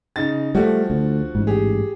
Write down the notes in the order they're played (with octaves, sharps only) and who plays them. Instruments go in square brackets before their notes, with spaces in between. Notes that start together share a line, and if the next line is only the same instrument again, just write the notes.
[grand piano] C#3 D#4 A6
[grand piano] F3 F#4 [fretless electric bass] G3 A3
[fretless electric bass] D2
A1 G#2
[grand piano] G4 G#4